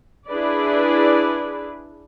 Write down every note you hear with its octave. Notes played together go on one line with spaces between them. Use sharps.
D4 E4 G#4 B4 D5